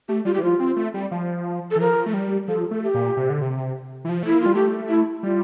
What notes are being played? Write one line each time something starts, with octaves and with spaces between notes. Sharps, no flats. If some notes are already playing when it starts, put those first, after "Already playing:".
A3 G4
G3 F4
G4
E3
F3 F4
C4
A3
G3
F3
A4
E3
F3 A#4
A3
G3
F3 A4
A3 A4
G4
A#2
C3
D3
C3
E3
F3
A3 E4
A#3
F4
G3
A3 G4
E4
G3 F4